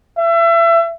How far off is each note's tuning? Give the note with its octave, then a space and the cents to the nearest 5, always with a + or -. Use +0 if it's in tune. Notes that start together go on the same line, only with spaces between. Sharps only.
E5 +30